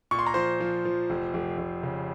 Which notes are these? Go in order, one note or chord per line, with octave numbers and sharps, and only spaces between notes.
A#2 C#6
C6
A#5
F3 C5 C6
F3
F3
F1
F1
F1
C#3